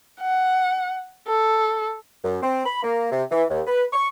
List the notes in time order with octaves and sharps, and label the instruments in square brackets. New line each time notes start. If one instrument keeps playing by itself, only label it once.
[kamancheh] F#5
A4
[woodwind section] F#2
C4
B5
A#3
C3
E3
D#2
B4
C#6